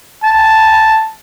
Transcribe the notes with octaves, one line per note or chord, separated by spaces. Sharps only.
A5